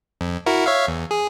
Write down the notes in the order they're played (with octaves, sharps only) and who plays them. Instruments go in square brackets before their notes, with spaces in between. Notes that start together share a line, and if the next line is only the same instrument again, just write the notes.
[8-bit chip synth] F2
E4 F#4 A#4
C#5 E5 F5
E2
G#4